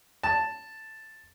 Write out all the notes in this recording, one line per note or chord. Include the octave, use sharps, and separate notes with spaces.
A5